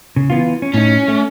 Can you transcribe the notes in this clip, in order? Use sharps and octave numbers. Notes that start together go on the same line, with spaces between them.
C#3
E3 B3 F4
C#4
A2 C#4 D#4
A3